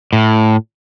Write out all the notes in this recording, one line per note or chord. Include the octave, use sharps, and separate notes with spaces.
A2